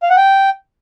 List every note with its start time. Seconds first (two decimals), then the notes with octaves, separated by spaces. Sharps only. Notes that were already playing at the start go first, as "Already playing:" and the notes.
0.03 F5
0.10 F#5
0.17 G5